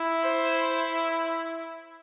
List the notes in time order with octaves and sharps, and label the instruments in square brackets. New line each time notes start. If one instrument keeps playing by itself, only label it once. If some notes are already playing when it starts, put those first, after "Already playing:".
Already playing: [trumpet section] E4
[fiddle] C5